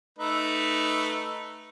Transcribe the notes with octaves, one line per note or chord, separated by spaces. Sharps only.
A3 D#4 B4